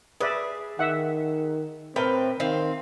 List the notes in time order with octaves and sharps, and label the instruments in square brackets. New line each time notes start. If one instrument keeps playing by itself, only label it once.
[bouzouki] G#4 [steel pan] B4 D5 E5
[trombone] D#3 [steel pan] E5 F#5
[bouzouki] A2 B4 G5 [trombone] C4 [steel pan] A#4
[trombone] D#3 [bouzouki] C4 F5